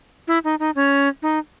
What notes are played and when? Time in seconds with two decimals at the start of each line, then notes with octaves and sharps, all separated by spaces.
0.28 E4
0.44 D#4
0.60 D#4
0.75 C#4
1.22 D#4